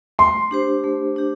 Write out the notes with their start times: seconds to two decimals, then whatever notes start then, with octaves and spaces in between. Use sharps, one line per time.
0.19 A3 C6
0.51 D4 G4 C5
0.84 A3
1.16 D4 G4